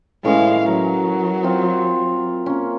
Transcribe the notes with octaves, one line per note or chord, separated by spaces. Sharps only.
A2 E3 G#3 C#4 F5
F#3 A#4
C4 F4
A#3 C#4